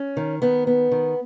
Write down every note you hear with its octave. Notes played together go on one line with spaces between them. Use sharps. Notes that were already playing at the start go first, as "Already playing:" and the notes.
Already playing: C#4
D#3
D#3 B3
B3
D#3